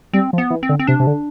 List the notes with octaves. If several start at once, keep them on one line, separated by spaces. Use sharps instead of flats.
G3 C4
F3
B3
E3
C4
D3
C4
C3 D4
C3
D3